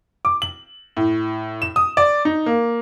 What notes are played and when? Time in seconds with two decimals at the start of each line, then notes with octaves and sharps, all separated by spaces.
0.25 D6
0.42 F#7
0.97 A2
1.62 E7
1.76 D#6
1.97 D5
2.25 D#4
2.46 A#3